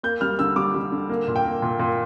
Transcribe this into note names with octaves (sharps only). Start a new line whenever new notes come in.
A#3 G6
G3 F6
D3 E6
G3 D6
G3
D3
A#3
A#2
G5
A#3
A#2
A#2